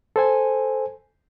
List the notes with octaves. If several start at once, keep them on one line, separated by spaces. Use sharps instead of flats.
A4 C5 G#5